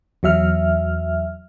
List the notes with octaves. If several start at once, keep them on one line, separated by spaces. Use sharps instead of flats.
E2 F#3 E5 F6